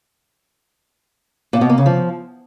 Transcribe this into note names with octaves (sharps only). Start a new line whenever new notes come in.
A#2
B2
A#3
C#3
F3